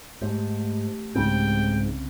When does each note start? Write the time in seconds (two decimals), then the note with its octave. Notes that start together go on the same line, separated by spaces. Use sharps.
0.21 G#2 A3 G4
1.15 C2 G#2 C#3 C4 G5